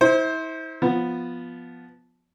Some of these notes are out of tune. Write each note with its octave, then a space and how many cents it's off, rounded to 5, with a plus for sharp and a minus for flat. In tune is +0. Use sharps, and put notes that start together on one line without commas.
E4 -35 C5 +10
F3 +0 B3 +0